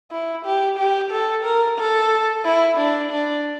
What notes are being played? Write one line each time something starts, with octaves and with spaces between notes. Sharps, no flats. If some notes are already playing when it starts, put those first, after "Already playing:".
E4
G4
G4
A4
A#4
A4
E4
D4
D4